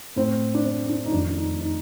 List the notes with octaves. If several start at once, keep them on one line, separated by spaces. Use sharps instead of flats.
A2 C4
D4
C4
D4
D#4
F2 D#3 D4
D4
D#4
D#4